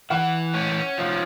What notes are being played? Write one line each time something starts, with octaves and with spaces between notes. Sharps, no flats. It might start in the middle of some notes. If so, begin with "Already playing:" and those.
E3 F#5
C#4
F3